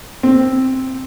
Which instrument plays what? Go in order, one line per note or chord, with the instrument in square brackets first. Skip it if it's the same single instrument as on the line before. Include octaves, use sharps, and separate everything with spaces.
[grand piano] C4